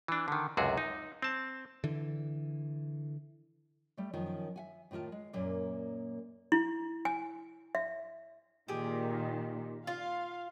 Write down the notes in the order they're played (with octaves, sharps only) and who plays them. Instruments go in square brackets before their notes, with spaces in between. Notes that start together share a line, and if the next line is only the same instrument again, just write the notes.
[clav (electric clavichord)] E3 D4
D3 D#3
C#2 F#2 C3 F#4 G#4
D#4
C4 A5
[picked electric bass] D3 E3
[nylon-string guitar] G3 A3
F#2 D#3 F3 A#4 G#5
E5 F#5 G#5
A2 D#3 F4 A#4 A5
G#3
F#2 A#2 A#3 D5
[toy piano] E4
G#5
E5
[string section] A#2 D#3 [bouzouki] G4 G#4
[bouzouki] F4 [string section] F5